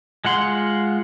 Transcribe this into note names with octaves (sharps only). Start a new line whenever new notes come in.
G#3 F4 F#5 C6